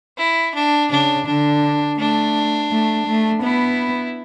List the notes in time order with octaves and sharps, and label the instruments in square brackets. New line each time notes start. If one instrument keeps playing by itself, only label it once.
[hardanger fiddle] E4
D4
[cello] C#3 [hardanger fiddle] D4
[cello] D3 [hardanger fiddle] D4
[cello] A3 [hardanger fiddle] D4
[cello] A3
A3
[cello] B3 [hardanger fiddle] E4